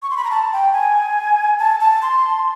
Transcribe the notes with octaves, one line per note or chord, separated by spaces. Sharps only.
C#6
C6
B5
A#5
A5
G5
G#5
A5
A5
C6